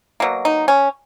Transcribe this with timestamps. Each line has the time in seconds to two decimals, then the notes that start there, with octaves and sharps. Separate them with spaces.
0.20 B2 F#3 A#3
0.45 D#4
0.68 C#4